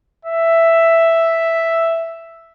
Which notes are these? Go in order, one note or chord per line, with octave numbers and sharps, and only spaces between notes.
E5